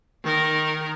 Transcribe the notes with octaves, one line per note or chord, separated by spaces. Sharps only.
D#3 A#4